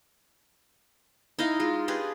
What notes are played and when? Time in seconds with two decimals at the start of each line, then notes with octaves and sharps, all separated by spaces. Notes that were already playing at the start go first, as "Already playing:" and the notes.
1.39 D#4 E4 D#5 F5
1.60 G#3 F4
1.88 D4 G4 G#4 B4